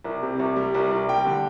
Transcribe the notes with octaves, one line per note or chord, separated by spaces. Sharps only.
C2
C3
C2
G3
C2
C2
G3 G5
D3